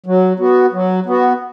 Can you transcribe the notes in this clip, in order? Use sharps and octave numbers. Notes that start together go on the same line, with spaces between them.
F#3
B3 F#4
F#3
B3 F#4